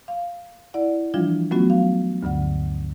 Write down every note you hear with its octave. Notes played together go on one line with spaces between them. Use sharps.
F5
E4 D5 F#5
E3 F3 G3 D4 F4
F#3 A3 B3 C#4 F4 F#4
F5
D2 G2 D3 F#5